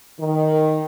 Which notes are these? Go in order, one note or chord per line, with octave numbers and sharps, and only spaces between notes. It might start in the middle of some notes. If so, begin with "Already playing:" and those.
D#3